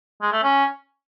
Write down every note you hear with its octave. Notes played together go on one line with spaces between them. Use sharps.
G#3
A3
C#4